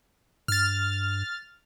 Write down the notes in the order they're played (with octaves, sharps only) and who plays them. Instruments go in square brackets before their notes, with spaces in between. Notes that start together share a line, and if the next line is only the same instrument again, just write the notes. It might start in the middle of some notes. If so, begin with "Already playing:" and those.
[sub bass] G2 [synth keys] F6 A6